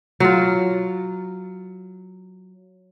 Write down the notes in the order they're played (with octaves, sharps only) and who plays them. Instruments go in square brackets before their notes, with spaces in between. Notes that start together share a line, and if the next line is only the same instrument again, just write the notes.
[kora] F#3 F4